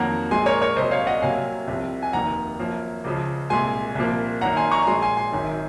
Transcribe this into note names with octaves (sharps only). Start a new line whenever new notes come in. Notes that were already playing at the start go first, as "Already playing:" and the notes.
Already playing: F2 D#3 F#3 A#3 F#5 A#5
A#1 A#2 G#3 G#5 C6
A#4 C#5
A#4 C#5
C2 A#2 F#3 C5 D#5
C#5 F5
D#5 F#5
C2 C3 F#3 A#3 F5 G#5
C2 C3 F3
G#5
F1 D#2 D#3 A#3 F#5 A#5
F#2 F3 A#3
C#2 C#3 F3
C2 A#2 G#3 G#5 C6
C2 A#2 F3 A#3
F#2 D#3 A#3 F#5 A#5
G#5 C6
A#5 C#6
A#5
A#1 A#2 G#3 G#5 C6
G#5 C6
G#5 C6
G#1 F#2 D#3